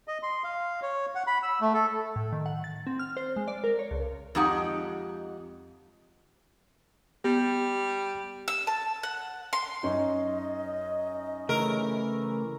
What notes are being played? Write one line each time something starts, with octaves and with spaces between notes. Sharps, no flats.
D#5
C6
F5
C#5
F#5
B5
E6
A3
A4
A2
D#3
F#5
A6
C4
F6
C5
G#3
D5
A#4
C#5
C#2
F2 G#3 D#4 G4 F#5
G3 B3 G4
E6
A5
F#5
C6
F#2 C#4 D#4 D#5
C#3 E3 A3 A#4